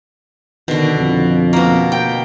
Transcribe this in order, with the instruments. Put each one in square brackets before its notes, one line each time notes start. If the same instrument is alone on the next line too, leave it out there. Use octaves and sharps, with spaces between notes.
[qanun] B2 D3 [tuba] D#3
[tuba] F2
[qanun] B2 A#3
G5